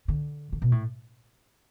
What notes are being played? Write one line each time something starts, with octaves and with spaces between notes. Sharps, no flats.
D3
D3
B2
A2